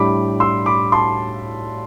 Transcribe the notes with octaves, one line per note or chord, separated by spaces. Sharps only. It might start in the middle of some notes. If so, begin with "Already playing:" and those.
Already playing: A2 G3 D4 B5 D6
C6 E6
B5 D6
A5 C6